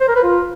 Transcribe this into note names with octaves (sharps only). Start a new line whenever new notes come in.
C5
A#4
B4
F4